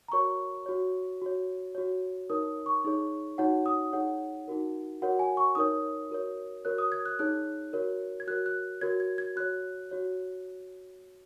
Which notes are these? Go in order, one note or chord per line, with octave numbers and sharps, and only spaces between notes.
A#5
F#4 A#4 C#5 C#6
F#4 C#5
F#4 C#5
F#4 C#5
D#4 A#4 C#5 D#6
C#6
D#4 G#4 C#5
D#4 F#4 C#5 F#5
D#6
D#4 G#4 C#5 F#5
D#4 F#4 A#4
F#4 A#4 C#5 F#5
G#5
C#6
D#4 A#4 C#5 D#6
F#4 A#4 C#5
F#4 A#4 C#5 F#6
D#6
G#6
F#6
D#4 G#4 C#5 F#6
F#4 A#4 C#5
G#6
F#4 A#4 C#5 F#6
F#6
F#4 A#4 C#5 G#6
G#6
G#6
F#4 C#5 F#6
F#4 C#5